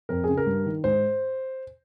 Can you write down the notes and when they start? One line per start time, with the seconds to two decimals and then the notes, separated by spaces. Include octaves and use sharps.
0.09 F2 A#4
0.24 C#3 G#4
0.37 A#4
0.46 G2
0.66 D#3
0.84 G#2 C5